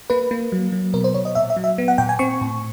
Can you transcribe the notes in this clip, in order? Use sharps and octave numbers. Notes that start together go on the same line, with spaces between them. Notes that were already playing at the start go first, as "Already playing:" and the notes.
A#3 B4
A#3
F#3
F#3
B2 A#4
C5
B2 C#5
D#5
A#2 E5
E5
F#3
E5
B3
F#5
A#2 G5
G#5
C4 C#6
A2